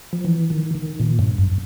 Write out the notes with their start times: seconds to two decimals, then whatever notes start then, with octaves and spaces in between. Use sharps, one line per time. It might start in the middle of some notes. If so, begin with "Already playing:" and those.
0.13 F3
0.25 E3
0.50 D#3
0.75 D#3
1.00 A#2
1.19 G2
1.38 F#2